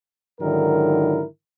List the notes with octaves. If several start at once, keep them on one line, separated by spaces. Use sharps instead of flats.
G#2 D3 D#3 F#3 E4 A#4